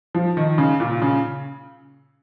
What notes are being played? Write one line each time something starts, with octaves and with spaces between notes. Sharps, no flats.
F3
D#3
C#3
A#2
C#3